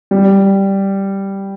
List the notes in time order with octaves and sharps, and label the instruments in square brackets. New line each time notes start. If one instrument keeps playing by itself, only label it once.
[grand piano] G3